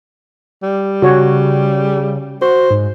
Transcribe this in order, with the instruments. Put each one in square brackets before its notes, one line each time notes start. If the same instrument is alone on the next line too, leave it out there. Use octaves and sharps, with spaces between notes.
[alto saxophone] G3
[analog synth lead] C#3 [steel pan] F#4 C#5
[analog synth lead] F#4 [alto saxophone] C5
[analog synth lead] G#2